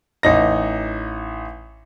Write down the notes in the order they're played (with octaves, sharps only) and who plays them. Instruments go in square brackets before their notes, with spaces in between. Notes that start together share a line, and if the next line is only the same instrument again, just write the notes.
[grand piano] A1 D#4 A#6